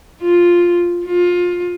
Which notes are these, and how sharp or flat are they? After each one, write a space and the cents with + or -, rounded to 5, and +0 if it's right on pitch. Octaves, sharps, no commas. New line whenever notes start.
F4 +5
F4 +20